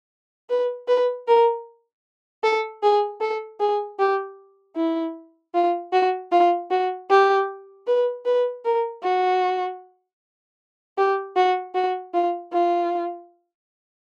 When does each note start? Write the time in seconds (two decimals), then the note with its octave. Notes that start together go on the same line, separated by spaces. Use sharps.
0.49 B4
0.88 B4
1.27 A#4
2.43 A4
2.83 G#4
3.21 A4
3.60 G#4
3.99 G4
4.76 E4
5.54 F4
5.93 F#4
6.32 F4
6.71 F#4
7.10 G4
7.87 B4
8.26 B4
8.65 A#4
9.03 F#4
10.98 G4
11.36 F#4
11.75 F#4
12.14 F4
12.52 F4